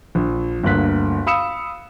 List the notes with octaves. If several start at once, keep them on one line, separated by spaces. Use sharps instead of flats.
A#1
G1 D2 A#3 F#6 B6
F5 B5 D#6 E6 C#7 E7